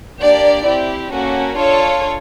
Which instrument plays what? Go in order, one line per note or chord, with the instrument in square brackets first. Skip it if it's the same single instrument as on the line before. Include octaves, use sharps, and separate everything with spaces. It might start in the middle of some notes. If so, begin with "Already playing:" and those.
[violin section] A#3 D4 G4 D5
C4 E4 G4
A#3 C#4 F#4 A4
D4 F4 A4 C#5